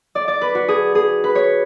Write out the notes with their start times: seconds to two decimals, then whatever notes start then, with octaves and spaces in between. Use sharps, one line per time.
0.15 D5
0.28 D5
0.41 B4
0.55 F#4
0.68 G#4
0.95 G#4
1.24 B4
1.35 C#5